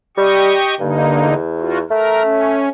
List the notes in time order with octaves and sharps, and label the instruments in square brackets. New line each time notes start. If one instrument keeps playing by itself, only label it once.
[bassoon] G3 [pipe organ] G4 D#5 C#6
[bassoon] G2 [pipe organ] D3 A#3 D#4
[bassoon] E2
[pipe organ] F4 F#4
[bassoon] A3 [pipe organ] A#4
[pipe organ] C#4